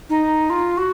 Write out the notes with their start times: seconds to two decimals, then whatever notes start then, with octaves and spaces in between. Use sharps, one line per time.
0.09 D#4
0.50 F4
0.77 F#4